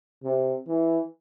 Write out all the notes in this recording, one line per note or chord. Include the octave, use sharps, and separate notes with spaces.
C3
E3